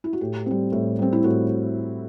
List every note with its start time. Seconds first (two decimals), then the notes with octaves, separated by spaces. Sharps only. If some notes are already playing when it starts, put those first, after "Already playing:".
0.04 E4
0.13 F#4
0.21 A2 G4
0.46 G3 C4
0.72 A2
0.99 G3 C4
1.13 E4
1.24 A2 F#4